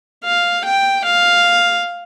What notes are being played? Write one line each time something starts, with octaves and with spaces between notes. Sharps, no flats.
F5
G5
F5